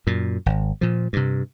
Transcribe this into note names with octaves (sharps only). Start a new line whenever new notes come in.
F#2 A#2
G#1
A#2 F3
G2 C3